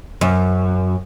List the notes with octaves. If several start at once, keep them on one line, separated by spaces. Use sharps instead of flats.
F#2